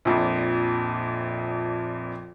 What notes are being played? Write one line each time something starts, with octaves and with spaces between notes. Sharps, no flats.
A#1 F2 A#2